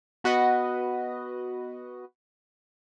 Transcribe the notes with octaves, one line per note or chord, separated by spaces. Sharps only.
B3 F#4 B4 D#5 F#5